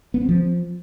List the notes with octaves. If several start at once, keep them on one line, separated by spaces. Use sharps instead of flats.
B3
C4
F3